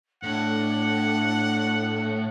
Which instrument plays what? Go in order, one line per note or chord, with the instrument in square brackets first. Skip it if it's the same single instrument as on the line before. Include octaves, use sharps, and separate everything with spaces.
[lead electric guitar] A2 [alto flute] D4 [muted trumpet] F#5